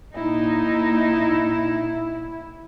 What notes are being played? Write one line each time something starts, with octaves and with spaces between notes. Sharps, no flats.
A#2 D#4 E4